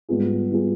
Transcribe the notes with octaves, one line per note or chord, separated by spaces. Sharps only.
G#2 G3 B3 F4 G#4
G3 B3 F4 G#4